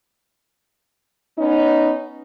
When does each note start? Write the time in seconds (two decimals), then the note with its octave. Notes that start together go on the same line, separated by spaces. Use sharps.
1.38 B3 C#4 D#4